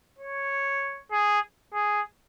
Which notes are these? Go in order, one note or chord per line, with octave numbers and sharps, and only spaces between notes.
C#5
G#4
G#4